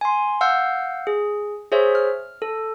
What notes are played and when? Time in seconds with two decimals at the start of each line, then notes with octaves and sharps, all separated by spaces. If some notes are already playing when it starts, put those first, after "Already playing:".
0.01 G#5 C6
0.41 F5 F#5 E6 F6 G6
1.07 G#4
1.72 G#4 C5 C#5 E5
1.95 F6
2.42 A4